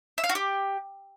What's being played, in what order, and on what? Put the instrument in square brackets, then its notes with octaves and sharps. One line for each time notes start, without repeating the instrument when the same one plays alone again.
[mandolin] E5
F5
F#4
G4